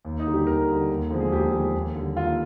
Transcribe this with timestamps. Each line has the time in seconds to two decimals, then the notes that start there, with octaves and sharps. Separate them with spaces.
0.05 D#2
0.19 D#4
0.26 D3 G3
0.34 G4
0.47 D#2 A#4
0.68 D3 G3
0.89 D#2
1.10 D3 F3 G#3
1.20 G#4
1.32 D#2 G4
1.52 D3 F3 G#3
1.74 D#2
1.95 D3 G3
2.16 D#2 F4